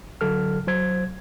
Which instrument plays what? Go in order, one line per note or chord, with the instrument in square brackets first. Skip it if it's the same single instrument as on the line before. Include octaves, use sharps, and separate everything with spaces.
[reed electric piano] D3 F#3 A4 F6
F#3 C5 G#6